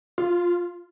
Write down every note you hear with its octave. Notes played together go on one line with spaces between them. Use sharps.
F4